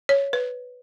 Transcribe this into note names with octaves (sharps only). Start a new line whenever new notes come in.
C#5
B4